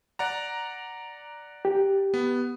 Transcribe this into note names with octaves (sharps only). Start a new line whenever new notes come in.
D5 F#5 A#5
G4
B3